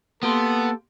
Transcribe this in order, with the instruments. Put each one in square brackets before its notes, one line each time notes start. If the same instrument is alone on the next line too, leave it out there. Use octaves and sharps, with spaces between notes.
[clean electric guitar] A#3 G4 C6 [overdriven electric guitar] B3 [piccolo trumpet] A4